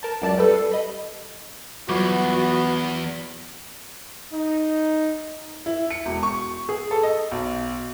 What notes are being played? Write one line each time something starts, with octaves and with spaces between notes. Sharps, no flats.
A#4 A5 G6
C#2 F#2 D5 A5
G3 A4 B4 G5
C7
D#5 B5
E2 F#3 G3 B3 F4 F#4
D#4
E4
C#7
E1
C#6
G#4
A4
D#5
B1